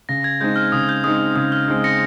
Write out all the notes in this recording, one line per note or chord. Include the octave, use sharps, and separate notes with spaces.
C#3 A#6
G#6
G#3 C4 D#4 G6
F6
C#3 D#6
G6
G#3 C4 D#4 D#6
C#3 D#6
F6
G#3 C4 D#4
A#6 C#7